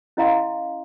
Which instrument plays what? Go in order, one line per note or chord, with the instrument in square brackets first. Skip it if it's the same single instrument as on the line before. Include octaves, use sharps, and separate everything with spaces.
[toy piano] C#4 E4 D#5 F5 A#5 C6